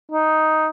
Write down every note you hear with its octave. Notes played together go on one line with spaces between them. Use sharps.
D#4